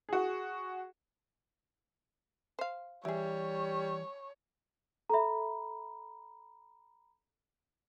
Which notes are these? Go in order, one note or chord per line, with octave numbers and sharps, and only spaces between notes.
F#4 G#4
C5 F5
E3 G3 E4 G#4 C#5
A4 E5 A#5 B5